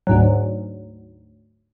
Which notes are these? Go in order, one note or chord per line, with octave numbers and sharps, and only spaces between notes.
D2 G#2 F#3